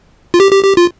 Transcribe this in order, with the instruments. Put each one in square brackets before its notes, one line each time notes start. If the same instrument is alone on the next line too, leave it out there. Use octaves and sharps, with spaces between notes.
[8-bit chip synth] F4
G4
G4
G4
F4